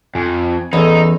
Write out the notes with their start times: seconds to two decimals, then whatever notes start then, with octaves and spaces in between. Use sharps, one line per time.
0.15 F2 G#5
0.73 E2 B3 C#4 D#4 A4